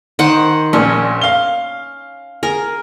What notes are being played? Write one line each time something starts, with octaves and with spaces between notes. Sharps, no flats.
D#3 C5 F#5
A#1 A#2 A#3 C#4
F5 G7
G#4 A#4